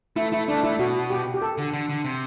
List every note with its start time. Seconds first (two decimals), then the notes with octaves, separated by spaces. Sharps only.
0.16 A3 E4
0.32 A3 E4
0.48 A3 D4
0.63 A3 E4
0.79 B2 F#4
1.10 G4
1.34 G4
1.42 A4
1.58 D3
1.73 D3
1.89 D3
2.04 C3